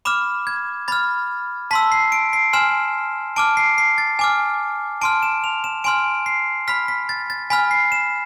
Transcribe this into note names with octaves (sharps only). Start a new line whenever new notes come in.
B5 D6 F6 E7
G#6
B5 F6 A6
A5 C6 E6 B6
C7
D7
C7
G#5 C6 F6 E7
A5 D6 F6 D7
C7
C7
A6
G#5 D6 F6
A5 C6 F6 D7
E7
F7
E7
G#5 C6 F6 D7
C7
B5 F6 B6
B6
A6
A6
G#5 B5 F6 B6
C7
E7